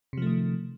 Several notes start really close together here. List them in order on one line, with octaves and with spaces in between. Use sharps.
C3 F3 A3 D#3